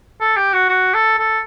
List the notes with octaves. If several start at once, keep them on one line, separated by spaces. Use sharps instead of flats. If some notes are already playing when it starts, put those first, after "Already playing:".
A4
G4
F#4
F#4
A4
A4